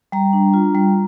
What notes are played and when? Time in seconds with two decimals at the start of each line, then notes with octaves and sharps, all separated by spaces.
0.12 G3 A#5
0.33 D4
0.54 F4
0.75 G3